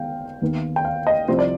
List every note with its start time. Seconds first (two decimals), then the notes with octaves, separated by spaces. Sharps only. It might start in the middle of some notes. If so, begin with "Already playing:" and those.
Already playing: D#3 G#3 B3 F5 G5
0.42 D#2 D#3 B3
0.76 G5
0.85 F5
1.07 D#5
1.28 C2 C3 F3 C4 C5
1.39 D5